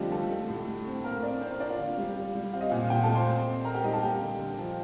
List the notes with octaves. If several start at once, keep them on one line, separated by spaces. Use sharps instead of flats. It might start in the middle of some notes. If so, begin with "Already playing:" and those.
Already playing: D3 F3 G3 A3 C4 D#4 F4 G4
D3 A3 A4
A3
A2
A3
C4
A2 A#3 A#4
C4 D4 D5
C4 C5
A#3 A#4
C4 D4 D5
F4 F5
D3
G3
G3
G3
C4 F5
D#5
A#2 F4 F5
A#2 G4 G5
A4 A5
A3
C5 C6
C4
C4
C4 A#4 A#5
G4 G5
G3 D#4 D#5
A4 A5
A#3 G4 G5
D3
D3
F3